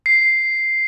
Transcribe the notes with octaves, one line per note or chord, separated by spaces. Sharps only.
C7